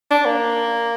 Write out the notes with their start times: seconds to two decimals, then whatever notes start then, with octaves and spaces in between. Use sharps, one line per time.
0.11 D4
0.25 A#3